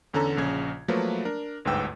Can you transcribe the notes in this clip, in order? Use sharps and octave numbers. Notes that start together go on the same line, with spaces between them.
E2 D3 C#4 A4 A#5
A#1 C#3 C#4 G#6
F3 F#3 A3 A#3 B4
D4 A#4
G1 D2 G#2 B4 G5 E6